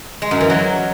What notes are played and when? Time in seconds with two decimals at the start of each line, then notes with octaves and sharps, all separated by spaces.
0.22 G#3
0.31 F#2
0.40 E3
0.50 F#3